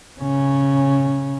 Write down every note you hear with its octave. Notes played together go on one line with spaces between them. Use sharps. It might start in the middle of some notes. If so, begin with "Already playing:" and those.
C#3 C#4